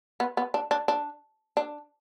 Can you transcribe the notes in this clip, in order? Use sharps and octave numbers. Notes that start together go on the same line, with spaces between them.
B3
B3
D4
D4
D4
D4